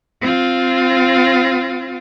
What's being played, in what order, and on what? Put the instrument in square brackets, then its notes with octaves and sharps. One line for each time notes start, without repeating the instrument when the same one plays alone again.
[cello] C4 F4